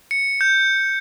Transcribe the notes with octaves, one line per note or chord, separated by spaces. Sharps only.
C#7
G6